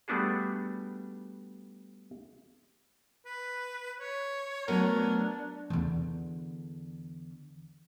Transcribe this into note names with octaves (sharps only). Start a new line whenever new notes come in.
G3 A3 B3 D4 F#4 G#4
B4
C#5
F#3 A3 B3 D4 A#4
E2 D3